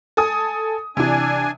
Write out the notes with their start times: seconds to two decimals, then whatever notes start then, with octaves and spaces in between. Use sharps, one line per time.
0.17 A4 G#5 D#6
0.97 C3 E3 D4 G#5